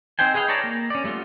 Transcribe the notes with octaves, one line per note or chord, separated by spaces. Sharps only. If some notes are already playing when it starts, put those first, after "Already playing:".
C4 D#4 C5 G5 G#5
G#4 B4 D#5 F5 G5
B4 C#5 D5 A5 A#5
A#3
C#4 D5
G3 A3 B3 F4